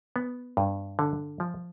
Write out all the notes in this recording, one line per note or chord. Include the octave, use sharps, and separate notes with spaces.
B3
G2
D3
F3